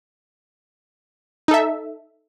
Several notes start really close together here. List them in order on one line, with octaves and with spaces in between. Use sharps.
D#4 A4 E5